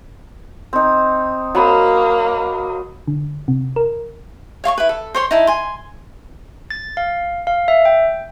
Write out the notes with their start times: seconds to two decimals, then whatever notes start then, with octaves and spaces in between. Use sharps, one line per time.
0.73 C4 D#4
1.55 F#3 A#3 B5 D#6
3.08 D3
3.48 C3
3.76 A#4
4.64 C#5 F5 C6 C#6
4.78 E4 B4
4.89 A4
5.14 C5 C#5 C6
5.31 D#4 E4 A5
5.47 G#5 C6
6.70 A6
6.97 F5
7.47 F5
7.68 E5
7.85 G5